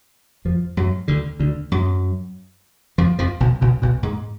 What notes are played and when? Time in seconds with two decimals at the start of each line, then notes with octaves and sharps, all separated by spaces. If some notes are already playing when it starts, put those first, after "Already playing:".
0.45 F2 F3
0.77 F#2 F#3
1.08 D2 D3
1.40 D2 D3
1.72 F#2 F#3
2.98 F2 F3
3.19 F2 F3
3.40 B1 B2
3.61 B1 B2
3.82 B1 B2
4.03 G#2 G#3